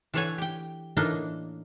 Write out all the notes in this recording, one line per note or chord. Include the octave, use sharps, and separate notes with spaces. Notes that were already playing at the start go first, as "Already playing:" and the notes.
E3 D4 A4 C#5 F#5 G#5
G4 G5
A2 E3 A#3 D4 D#4 D#5